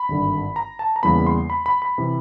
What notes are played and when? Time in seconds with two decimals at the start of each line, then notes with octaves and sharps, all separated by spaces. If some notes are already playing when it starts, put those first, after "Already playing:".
Already playing: B5
0.08 G#1 G2 D3
0.56 A#5
0.79 A5
0.96 A#5
1.03 E2 C#3 E3 G3 A#3 B5
1.27 C6
1.50 B5
1.66 B5
1.82 B5
1.98 C3 E3